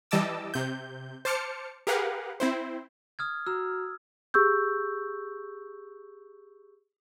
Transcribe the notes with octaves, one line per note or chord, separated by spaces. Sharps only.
E3 G3 D#5 A5 D6 E6
C3 G6
C5 A5 D6 F6 C#7
G4 G#4 A#4 B4 F5 F#5
C4 E4 C5
D#6 F6 G#6
F#4 A#5 E6 F6
G4 G#4 C#6 E6 G6